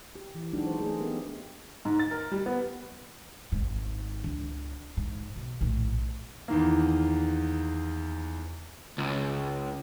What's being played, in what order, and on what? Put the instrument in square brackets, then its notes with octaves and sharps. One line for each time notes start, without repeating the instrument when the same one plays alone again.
[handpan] G4
E3
F#3 G#3 D4 D#4 F#4
C4 C5
A3 A#3 G#4
B3 C#4 G4 A4 A#4
[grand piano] G#2
A6
A#4
G3
B3
[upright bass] G#1 G#2
C#2 D4
G#2
B2
A#1 A2
[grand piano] E2 D#3 A#3
[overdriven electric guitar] C#2